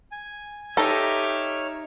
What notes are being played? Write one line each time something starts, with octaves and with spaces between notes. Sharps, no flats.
G#5
D#4 G4 A4 C#5 D#5 E5 F6